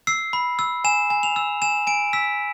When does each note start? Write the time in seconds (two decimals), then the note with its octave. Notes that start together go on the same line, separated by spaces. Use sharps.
0.07 E6 C7
0.33 B5
0.59 E6
0.84 G#5 E7
1.10 G#5
1.23 F7
1.36 E6
1.62 G#5 E7
1.87 G#5 D7
2.13 E6 B6